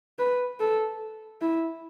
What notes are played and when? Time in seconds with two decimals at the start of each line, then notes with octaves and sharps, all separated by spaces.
0.19 B4
0.60 A4
1.42 E4